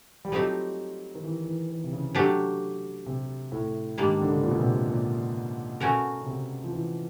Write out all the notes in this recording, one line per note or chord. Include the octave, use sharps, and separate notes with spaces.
G3
F3 F#3 A3 C4 D#4 G4
D#3
E3
E3
D#3
C3
C#3
F#3 A3 D4 G4
C3
A2
G#2 D#3 G3 A#3 D4
D3
C#3
A#2
B2
C3
A#2
B2 A3 C#4 F#4 A#4
C#3
C3
F3
E3